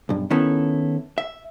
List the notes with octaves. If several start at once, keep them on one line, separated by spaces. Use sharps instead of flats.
B1 G2
D#3 B3 C#4 E4 A4
E5